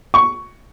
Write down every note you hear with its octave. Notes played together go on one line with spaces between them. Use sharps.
C#6